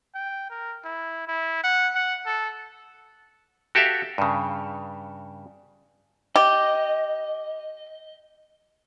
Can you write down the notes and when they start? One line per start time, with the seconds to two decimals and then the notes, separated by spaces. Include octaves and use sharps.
0.15 G5
0.50 A#4
0.85 E4
1.28 E4
1.64 F#5
1.95 F#5
2.26 A4
3.75 F#4 G4 A4 E5 F5
4.18 G2 C#3
6.36 G4 D#5